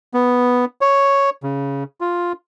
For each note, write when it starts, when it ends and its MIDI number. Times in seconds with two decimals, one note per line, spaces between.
0.14 0.65 59
0.81 1.30 73
1.43 1.84 49
2.01 2.32 65